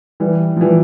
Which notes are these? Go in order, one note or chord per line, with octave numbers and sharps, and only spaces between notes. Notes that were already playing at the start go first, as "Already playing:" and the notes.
E3 G3
F3
E3 G3